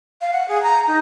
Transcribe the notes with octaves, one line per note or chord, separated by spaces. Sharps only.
F5
F#5
G#4
A#5
D#4